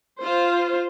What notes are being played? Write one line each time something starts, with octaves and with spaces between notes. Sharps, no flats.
F4 C5